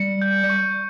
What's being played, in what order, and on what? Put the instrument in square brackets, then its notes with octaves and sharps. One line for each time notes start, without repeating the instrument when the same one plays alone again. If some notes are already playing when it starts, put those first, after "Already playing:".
Already playing: [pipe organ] G3 [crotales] C#7
[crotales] G6
C#6